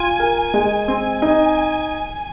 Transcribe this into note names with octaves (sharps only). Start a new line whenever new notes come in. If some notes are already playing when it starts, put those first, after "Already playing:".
Already playing: F4 G#5
A#4
G#3
C4 G#5
D#4